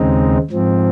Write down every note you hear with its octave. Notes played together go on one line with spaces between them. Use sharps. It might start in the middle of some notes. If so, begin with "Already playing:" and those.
Already playing: D#2 C#3 G#3 C4 D#4
G#2 F3 C4